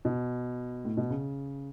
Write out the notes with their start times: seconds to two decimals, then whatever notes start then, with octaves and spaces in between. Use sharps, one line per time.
0.05 B2
0.85 A2
0.97 B2
1.10 C#3